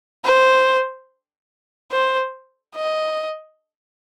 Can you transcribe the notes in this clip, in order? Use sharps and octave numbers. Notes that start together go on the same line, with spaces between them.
C5
C5
D#5